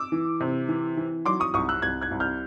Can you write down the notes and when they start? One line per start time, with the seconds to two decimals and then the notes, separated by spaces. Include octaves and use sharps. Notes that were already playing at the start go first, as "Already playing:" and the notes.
Already playing: D6 E6
0.12 E3
0.40 C3
0.69 E3
0.97 E3
1.26 F#3 C6 D6
1.40 C#6 D#6
1.54 C2 C#6 D#6
1.69 E6 F#6
1.82 C2 F#6 G#6
2.01 F#6 G#6
2.11 C2
2.20 F6 G6